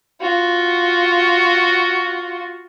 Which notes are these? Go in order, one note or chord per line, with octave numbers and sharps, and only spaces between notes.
F4 F#4